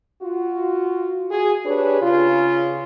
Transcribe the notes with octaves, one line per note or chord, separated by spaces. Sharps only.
F4 F#4
F#4 G#4
D4 G4 G#4 B4 C#5
C#3 F4